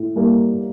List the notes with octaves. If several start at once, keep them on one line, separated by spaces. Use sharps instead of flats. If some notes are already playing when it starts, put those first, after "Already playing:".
Already playing: A2
G3 A#3